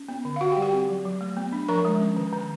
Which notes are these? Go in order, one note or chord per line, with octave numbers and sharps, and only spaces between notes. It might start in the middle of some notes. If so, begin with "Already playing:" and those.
Already playing: C#4
B3
D3
F5
D3 F#4 F#5
G4 G5
G3
G4 G5
C4
F#3
F#3
A3
B3
D4
F3 A#4 A#5
G#3
C#4
D#3
D#3